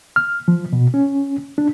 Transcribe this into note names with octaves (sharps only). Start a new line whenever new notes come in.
F6
F3
B2
C#4
D4